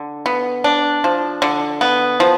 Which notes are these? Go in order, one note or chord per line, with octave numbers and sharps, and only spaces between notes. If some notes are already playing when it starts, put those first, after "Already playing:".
Already playing: D3
B3
D4
F3
D3
B3
F3